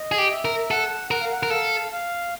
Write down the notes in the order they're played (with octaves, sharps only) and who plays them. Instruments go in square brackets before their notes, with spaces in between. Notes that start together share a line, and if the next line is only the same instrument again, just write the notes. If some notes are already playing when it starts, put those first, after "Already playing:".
Already playing: [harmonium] D#5
[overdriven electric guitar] G#4
G4
[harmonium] E5
[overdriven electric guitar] A#4
[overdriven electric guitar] A4 [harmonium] F#5
[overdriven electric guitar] A#4 [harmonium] F#5
[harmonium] F5
F#5
[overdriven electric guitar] A#4
[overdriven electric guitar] A4 [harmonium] F5
[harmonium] F5